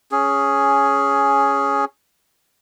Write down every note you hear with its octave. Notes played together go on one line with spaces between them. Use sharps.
C#4 G#4